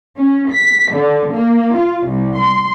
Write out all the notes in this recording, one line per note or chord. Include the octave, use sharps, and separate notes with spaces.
C#4
B6
D3
A#3
F4
C2
C6